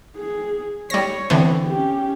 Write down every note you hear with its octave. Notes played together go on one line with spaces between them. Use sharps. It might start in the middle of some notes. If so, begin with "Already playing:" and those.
G#4
G3 C#5 A#6
D3 E3 B3 C4
C#4 G4